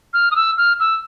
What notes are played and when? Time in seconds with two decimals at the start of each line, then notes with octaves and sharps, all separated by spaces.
0.14 F6
0.31 D#6
0.36 E6
0.58 F6
0.80 E6